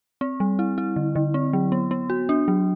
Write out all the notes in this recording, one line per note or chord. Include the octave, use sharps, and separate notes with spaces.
C4
G3
E4
E4
D3
D3
C4
F#3
B3
B3
F#4
D4
F#3